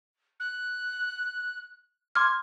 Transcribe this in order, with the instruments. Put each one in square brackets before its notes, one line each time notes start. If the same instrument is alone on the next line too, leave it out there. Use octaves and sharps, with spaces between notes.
[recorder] F#6
[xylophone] C6 D6 F6 [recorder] G#6